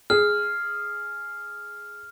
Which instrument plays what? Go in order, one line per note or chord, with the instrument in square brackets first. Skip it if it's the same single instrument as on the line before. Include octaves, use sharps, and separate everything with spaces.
[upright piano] G#4 [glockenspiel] F6